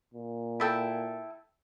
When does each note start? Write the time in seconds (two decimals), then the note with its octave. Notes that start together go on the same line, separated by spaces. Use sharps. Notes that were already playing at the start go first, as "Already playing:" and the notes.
0.14 A#2
0.60 E4 A4 G5